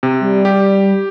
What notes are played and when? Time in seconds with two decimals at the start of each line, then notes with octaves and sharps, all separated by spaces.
0.03 C3
0.20 G3
0.45 G4